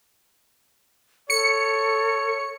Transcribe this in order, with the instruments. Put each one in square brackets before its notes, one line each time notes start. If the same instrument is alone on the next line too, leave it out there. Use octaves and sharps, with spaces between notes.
[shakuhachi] A4 [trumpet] C#5 [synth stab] C#7